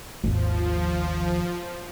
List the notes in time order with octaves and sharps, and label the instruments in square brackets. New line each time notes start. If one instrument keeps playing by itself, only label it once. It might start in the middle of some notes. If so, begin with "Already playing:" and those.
[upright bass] G#1 D#2 [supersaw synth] F3